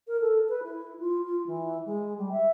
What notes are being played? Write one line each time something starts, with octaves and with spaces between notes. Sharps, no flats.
A#4
A4
B4
E4
F4
F4
E3
G#3
G3
E5